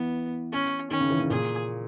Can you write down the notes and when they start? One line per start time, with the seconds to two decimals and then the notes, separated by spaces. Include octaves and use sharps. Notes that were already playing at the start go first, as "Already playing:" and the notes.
Already playing: E3 B3
0.52 C#4
0.91 D#3 C#4
1.00 C#3
1.10 E3
1.20 C#3
1.30 A#2 G#4